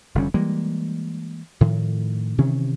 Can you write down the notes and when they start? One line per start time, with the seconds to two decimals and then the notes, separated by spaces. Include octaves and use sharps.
0.15 F1 D3 G3 C#4
0.34 E3 G3 G#3 A#3
1.61 A2 D#3 F3
2.38 C3 D#3 E3 C#4